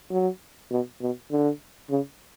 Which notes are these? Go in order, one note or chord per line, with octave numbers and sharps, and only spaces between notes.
F#3
B2
B2
D3
C#3